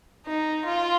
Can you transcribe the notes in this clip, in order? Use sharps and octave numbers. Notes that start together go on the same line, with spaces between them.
D#4
F4